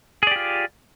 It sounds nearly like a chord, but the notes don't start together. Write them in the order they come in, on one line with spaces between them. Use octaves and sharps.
G#4 D5 G4 F4